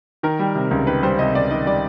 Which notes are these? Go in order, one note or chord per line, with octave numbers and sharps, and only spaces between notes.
D#3 A#4
G3
C3
C#2
D#3 B4
G3 C5
C3 D#5
C#2 D5
D#3 D#5
G3 D5